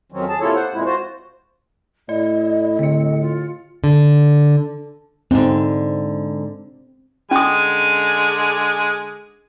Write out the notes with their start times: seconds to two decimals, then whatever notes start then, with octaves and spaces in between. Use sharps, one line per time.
0.12 F2 D#3 F#3 C4 C#4
0.29 G#4 A5
0.40 C3 A#3 E4 F4 A4 C#5
0.55 C5 F#5
0.73 F2 A#2 G#3 E4
0.85 F4 F#4 C5
2.09 A2 E4 D5 D#5
2.79 D3 C4 C#7
3.21 F4
3.84 D3
5.31 G#2 D3 C4
7.31 D3 G#3 C#4 G#5 D#6